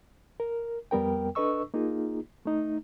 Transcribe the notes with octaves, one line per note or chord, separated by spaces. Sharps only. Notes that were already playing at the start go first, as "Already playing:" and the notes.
A#4
F2 G3 B3 A#4 G5
D4 A4 B4 D#5 C#6 E6
A#3 D#4 F4 G#4
A3 D#4